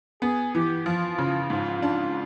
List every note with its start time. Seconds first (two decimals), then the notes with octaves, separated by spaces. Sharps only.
0.22 B3 G#4
0.54 E3 G4
0.86 F3 F4
1.18 C#3
1.50 G#2
1.82 D4